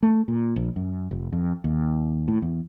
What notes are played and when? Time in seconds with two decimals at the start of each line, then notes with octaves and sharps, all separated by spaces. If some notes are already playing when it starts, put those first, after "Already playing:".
0.03 A3
0.28 A#2
0.56 A#1
0.76 F#2
1.11 F1
1.32 F2
1.64 D#2
2.28 A2
2.42 E2